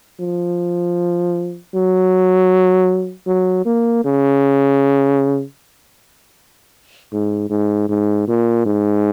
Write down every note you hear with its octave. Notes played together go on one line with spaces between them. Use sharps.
F3
F#3
F#3
A#3
C#3
G#2
G#2
G#2
A#2
G#2